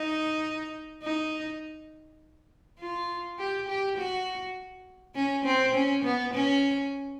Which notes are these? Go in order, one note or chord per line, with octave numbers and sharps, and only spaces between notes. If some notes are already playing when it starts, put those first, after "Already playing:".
Already playing: D#4
D#4
F4
G4
G4
F#4
C#4
C4
C#4
B3
C#4